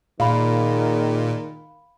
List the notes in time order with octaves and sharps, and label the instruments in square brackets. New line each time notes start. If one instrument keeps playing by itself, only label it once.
[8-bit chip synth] A#2 [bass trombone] D#3 [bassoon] G#3 [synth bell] F5 B5